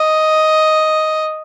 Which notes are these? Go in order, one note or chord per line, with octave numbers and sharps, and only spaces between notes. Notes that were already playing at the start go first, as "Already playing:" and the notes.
Already playing: D#5